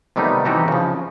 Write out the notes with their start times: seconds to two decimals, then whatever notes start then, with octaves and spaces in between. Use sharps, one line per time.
0.16 C3 D#3 G3 A3 B3 D#4
0.45 C3 E3 D#4 F#4 G4 A4
0.68 C#3 F3